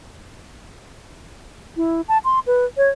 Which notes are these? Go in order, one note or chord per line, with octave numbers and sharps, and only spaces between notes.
E4
A5
C6
B4
C#5